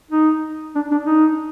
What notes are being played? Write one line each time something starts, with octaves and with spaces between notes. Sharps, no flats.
D#4
D4
D4
D#4